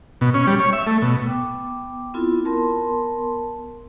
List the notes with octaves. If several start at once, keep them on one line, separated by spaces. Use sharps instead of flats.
B2
C#4
G3
C#5
E5
A3
B2
B3 G5 D6
B3 C4 E4 F4 A4
B3 A#4 A5 C6